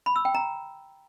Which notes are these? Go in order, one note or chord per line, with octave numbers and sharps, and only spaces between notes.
B5
E6
G5
A#5